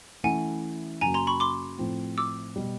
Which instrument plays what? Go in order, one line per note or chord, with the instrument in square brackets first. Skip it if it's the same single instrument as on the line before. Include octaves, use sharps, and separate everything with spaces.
[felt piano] E3 A3 C#4 E4 [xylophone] F#5 G#5
[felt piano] F#2 C#3 F#3 A#3 [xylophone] G#5 A#5
[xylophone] A#5 C6
B5 C#6
C6 D6
[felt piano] A2 F3 A3 C4 F4
[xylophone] D6 E6
[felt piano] B2 G3